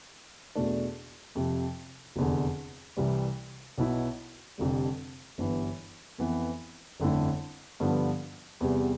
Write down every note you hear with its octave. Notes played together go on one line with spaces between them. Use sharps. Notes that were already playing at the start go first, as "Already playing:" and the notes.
E2 B2 A3 D4
F2 C3 F3
F1 E2 D3
C2 C3 E3 G3
B1 B2 B3 E4
F1 F2 D3 G3
G1 G2 E3 B3
F2 E3 B3
G1 F2 D3 A3 E4
G2 D3 F3 B3 D4
E2 C3 G3 B3